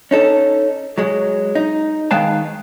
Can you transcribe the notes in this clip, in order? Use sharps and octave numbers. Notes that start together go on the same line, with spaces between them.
C#4 D#4 A4
F#3 G#3
D#4
D#3 G#3 B4 F5 G5 A5